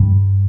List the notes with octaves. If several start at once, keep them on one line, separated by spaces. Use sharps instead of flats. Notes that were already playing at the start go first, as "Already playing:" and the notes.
Already playing: G2